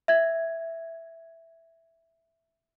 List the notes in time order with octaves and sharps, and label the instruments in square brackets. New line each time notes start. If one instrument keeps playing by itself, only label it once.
[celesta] E5 G#6